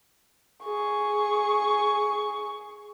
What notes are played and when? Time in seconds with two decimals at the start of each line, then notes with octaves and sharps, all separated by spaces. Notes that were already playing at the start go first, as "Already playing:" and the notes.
0.64 G#4 C#6